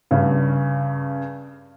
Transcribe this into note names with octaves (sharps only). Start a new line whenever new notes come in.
G2 C#3